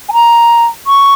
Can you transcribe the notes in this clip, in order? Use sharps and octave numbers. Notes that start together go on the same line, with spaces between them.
G#5
A#5
C#6